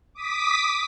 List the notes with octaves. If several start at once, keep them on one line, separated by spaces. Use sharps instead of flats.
D6 D#6 B6